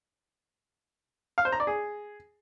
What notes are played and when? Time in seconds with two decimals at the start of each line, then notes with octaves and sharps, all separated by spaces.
1.38 F5
1.45 C5
1.52 A#5
1.60 D5
1.67 G#4